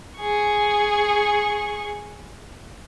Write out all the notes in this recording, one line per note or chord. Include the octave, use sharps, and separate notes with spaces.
G#4 C#6